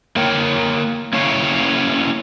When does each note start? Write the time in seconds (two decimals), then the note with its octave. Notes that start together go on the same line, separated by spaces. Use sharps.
0.16 A#3 A#4 C#5 G5
1.13 A#3 C#4 E4 C#5 F5